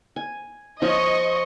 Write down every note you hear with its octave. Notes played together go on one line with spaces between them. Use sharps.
G#5
F3 F4 C#5 D#5 C#6